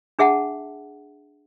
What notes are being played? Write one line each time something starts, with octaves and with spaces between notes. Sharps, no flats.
D4 G#4 E5 F#5 A5